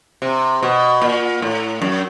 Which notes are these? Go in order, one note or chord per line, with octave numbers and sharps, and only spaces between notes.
C3
B2
A#2
A2
F#2